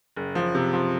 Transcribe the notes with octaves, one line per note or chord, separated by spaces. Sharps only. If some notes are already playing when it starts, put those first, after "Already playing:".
F#1
F3
C3
F3